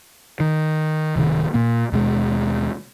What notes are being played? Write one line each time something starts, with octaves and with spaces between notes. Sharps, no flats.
D#3
D1 C3 D#3
A#2 A#3
D#2 B2 G#3